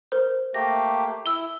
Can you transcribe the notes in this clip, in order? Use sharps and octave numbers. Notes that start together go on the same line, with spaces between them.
A#4 C5
A3 A#3 G4 A#6
E4 E6 G7